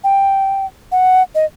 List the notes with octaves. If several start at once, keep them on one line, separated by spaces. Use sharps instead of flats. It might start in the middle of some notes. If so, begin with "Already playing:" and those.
G5
F#5
D#5